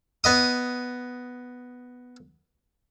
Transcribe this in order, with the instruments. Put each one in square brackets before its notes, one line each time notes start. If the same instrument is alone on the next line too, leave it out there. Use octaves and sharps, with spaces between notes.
[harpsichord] B3 D#5 D#6